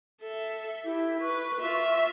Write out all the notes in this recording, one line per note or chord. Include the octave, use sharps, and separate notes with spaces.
A4 E5
E4 G4
B4 C#6
F4 E5